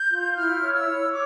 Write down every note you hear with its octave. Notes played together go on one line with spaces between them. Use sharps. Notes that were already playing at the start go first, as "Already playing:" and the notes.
Already playing: G6
F4
E4 F6
C#5
E6
C#5
C#5 D6